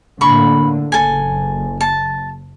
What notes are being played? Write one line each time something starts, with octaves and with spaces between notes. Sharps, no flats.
A2 D3 A#3 B5 C#6
F#1 A4 G#5
A5